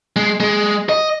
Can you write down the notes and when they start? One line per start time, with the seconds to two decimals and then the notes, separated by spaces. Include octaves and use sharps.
0.16 G#3
0.40 G#3
0.89 D#5